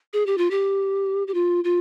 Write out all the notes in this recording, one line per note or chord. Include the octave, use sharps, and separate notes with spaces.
G#4
G4
F4
G4
G4
F4
F4